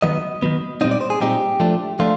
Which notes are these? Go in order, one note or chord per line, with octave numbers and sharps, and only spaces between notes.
D#3 F#3 B3 D#5
D#3 F#3 B3
A#2 G3 C4 D#4 D#5
D5
C5
G#4
A#2 G3 C4 D#4 G4
F3 A3 D4
F3 A3 D4 F4